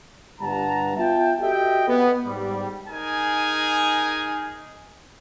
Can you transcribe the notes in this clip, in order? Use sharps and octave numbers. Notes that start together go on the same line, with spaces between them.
G1 G2 G3 F#5 A5 A#5
B3 F4 E5 G5 A5
F#4 G4 A4 D#5 E5 G5
B3
G#2 G3
D#4 G#4 A#4 G#5